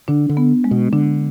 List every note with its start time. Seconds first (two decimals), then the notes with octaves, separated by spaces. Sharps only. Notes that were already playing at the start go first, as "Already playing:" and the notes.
0.08 D3 D4
0.29 D3
0.37 B3
0.64 G#3
0.71 B2
0.93 D3 D4